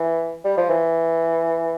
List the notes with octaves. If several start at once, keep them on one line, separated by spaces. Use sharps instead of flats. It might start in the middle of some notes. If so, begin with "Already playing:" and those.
Already playing: E3
G3
F3
E3